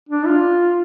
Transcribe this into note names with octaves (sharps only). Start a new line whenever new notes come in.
D4
F4